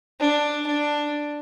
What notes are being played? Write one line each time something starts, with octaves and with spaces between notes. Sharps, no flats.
D4
D4